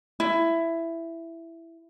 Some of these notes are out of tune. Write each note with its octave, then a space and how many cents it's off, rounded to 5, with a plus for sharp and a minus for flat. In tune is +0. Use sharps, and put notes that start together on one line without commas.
E4 +10